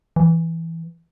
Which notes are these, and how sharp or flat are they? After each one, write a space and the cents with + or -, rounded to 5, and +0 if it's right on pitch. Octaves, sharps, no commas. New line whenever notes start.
E3 +0